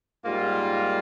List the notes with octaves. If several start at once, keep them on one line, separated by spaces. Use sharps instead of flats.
G#2 G3 A#3 F4